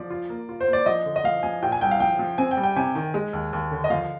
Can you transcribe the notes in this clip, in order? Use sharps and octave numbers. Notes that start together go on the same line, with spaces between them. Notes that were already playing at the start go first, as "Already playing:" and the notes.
Already playing: F3 D5
F4
A#3
F4
C5
A#3
D5
F3 D#5
D3
D#5
F3 F5
F3 G#5
A#2 G5
G#5
C2 G5
F5
F3 G5
F3
C4 G#5
G5
G3
G5
C3 G#5
D#3
G#3
D#2
D#2
D3
D#5
F3 F5